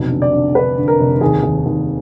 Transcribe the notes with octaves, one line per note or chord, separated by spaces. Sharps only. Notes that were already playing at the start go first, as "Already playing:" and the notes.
Already playing: F1 B1
D3
D5
D3
D3 B4
D3
A#4
F1
D#2 G#4
D#2
D#2